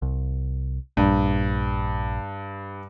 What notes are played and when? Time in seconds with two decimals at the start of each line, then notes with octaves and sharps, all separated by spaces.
0.02 C2
0.97 A#1 G2